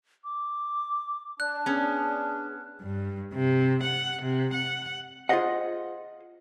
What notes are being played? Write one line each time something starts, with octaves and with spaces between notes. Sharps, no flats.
D6
D4 D5 F#6
B3 C#4 G#4
G2
C3
F#5
C3
F#5
F4 G#4 A4 C5 D#5 F#5